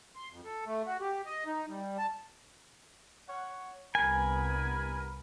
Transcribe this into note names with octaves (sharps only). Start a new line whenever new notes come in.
C6
F2
A4
A3
F#4
G4
D#5
D#4
G3
A5
C#5 F#5
C2 G2 B3 A#4 G#5 B5